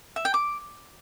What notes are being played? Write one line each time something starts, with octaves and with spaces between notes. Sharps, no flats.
E5
G5
D6